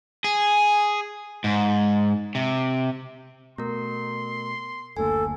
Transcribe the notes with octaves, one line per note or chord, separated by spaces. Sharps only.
G#4
G#2
C3
B2 A3 A#4 C6
F#1 D2 A#3 A4 G#5